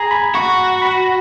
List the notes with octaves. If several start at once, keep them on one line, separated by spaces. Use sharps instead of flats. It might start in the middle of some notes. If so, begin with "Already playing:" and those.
Already playing: G#4 A#5
B5
F#4 C#6
B5